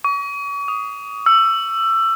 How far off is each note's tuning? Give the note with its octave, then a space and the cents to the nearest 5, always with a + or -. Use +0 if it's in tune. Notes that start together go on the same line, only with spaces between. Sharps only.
C#6 +40
D#6 +0
E6 +20